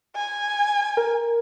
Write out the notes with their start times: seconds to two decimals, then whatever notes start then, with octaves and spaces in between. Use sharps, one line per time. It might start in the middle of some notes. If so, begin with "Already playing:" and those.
0.15 G#5
0.97 A#4